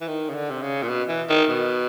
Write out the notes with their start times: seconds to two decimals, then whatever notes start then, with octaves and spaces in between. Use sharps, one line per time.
0.01 E3
0.07 D#3
0.30 C#3
0.34 D3
0.50 C3
0.62 C#3
0.83 A#2
0.89 B2
1.08 E3
1.29 D#3
1.50 B2